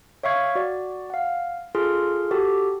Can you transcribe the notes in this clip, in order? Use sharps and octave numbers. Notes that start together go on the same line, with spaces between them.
C#5 E5 F5 C#6 G#6
F#4 D5
F5 F#5
F4 G#4 A4 C6 F6
F#4 G4 A4